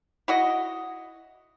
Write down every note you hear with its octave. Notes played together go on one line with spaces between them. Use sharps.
E4 F#4 D#5